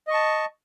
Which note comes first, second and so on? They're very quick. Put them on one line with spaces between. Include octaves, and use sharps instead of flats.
D#5 C#6 A5